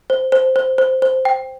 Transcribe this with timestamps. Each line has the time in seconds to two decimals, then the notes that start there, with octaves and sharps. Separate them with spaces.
0.10 C5
0.32 C5
0.56 C5
0.78 C5
1.02 C5
1.25 G5